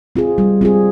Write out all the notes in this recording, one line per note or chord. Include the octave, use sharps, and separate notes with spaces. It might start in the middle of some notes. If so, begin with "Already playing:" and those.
C4 F4 G#4
G3
C4 F4 G#4